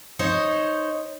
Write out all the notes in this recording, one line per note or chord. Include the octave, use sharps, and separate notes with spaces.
D#4 C5 C#5